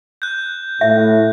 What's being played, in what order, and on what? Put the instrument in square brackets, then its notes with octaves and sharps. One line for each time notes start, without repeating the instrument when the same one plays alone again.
[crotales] F#6 G6
[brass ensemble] A2 [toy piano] E5